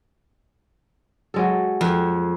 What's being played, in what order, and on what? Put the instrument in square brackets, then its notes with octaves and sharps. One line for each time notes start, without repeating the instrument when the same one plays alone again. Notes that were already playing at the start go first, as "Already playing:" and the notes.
[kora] F#3 G#3 A4
[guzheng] F2